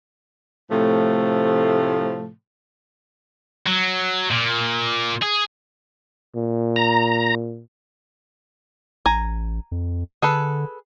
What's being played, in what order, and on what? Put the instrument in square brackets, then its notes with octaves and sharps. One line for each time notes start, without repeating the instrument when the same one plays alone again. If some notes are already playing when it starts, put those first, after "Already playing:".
[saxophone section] A2 C3 F3 A3
[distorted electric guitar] F#3
A#2
G#4
[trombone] A#2
[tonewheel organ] A#5
[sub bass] A1 [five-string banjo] G#5 A#5
[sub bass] F2
[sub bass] D3 [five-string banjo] G#4 A4 B4